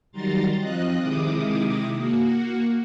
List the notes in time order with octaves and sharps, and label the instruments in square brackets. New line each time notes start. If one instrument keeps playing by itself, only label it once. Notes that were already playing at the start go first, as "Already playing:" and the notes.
[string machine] D#3 F#3 G3 A#5 C6 A6
F3 C4 F4 D#5 F#6
C3 D#3 G#3 E4 D6 D#6
A#3 F#4